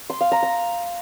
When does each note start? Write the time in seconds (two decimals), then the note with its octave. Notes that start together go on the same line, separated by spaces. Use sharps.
0.10 C6
0.21 F5
0.32 A#5
0.43 A#5